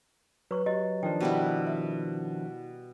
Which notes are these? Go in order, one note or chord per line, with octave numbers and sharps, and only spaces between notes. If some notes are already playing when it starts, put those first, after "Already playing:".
F#3 B4 C#6
F#3 G4 D#5
D#3 F3 D4 G5
B2 G3 E4
E5